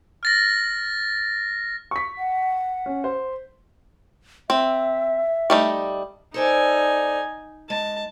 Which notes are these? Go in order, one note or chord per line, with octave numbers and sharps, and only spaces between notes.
F6 A6 A#6
C#6 B6
F#5
C#4
C5
C4 E5
G3 A3 D#4
D#4 A4 C5 D5 G#5
G#3 A5